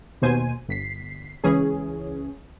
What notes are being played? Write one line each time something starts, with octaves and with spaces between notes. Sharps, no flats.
D#2 B2 C5 G#5 D#7
G1 B6 C7
C#2 E3 C#4 G#4